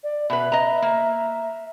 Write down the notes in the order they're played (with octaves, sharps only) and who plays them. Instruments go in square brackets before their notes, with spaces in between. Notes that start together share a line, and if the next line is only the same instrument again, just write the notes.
[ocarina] D5
[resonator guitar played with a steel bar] B2 B4 [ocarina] E5
[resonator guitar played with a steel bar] D#5 A#5
A#3